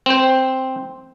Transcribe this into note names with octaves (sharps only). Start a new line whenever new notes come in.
C4 C5